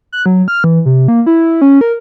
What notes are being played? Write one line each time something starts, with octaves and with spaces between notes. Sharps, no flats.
F#6
F#3
F6
E3
C3
A#3
E4
C#4
A#4